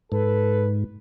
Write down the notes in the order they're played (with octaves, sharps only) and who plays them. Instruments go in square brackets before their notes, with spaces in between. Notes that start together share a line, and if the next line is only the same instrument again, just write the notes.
[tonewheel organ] G#2 [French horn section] A4 B4